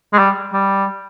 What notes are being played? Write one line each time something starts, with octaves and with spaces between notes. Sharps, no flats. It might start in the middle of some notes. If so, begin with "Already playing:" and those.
G#3
G3
G3